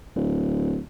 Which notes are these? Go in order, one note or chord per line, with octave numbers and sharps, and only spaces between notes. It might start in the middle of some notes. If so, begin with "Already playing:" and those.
D1